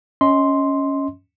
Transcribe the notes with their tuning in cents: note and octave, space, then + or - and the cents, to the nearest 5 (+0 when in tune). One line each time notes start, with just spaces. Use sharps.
C#4 +0 D#5 +25 C6 +0